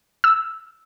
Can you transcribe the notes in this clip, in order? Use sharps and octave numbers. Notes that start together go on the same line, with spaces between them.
E6